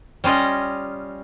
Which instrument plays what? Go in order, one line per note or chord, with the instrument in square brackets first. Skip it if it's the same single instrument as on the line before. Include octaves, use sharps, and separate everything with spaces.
[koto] G3 C#4 F4 D#5